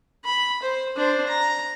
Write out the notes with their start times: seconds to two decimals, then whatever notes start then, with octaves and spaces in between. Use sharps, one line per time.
0.25 B5
0.63 C5
0.96 D4 C5
1.27 A#5